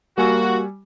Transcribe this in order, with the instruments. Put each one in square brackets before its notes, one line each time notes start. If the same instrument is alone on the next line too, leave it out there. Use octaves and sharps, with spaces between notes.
[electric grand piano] G3 G#5 E6 [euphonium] A#3 [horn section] F#4